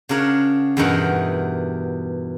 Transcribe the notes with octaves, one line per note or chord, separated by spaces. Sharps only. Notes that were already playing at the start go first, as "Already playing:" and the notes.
C#3 D4 A#4 C#5 F#5
E2 G2 B2 D#4 A#4 F#5